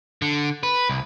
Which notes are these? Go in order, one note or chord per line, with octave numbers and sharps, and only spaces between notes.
D3
B4
C2